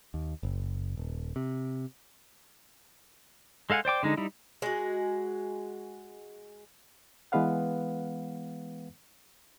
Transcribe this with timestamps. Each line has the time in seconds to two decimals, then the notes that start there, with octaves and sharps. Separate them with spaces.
0.14 D#2
0.43 F#1
0.97 D#1
1.36 C3
3.70 G#3 A4 F5 F#5 G#5
3.85 C5 D5 G5 D6
4.03 D3 G#3 D#4
4.17 G3 D#4 E4
4.62 G#3 F#4
7.32 E3 G#3 B3 B4 F5 F#5